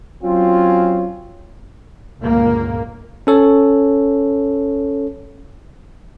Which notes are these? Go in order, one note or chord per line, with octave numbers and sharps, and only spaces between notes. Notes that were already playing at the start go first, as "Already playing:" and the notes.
F#3 C4 C#4 F4
G1 C#2 A#2 A#3
C#4 A4 C#5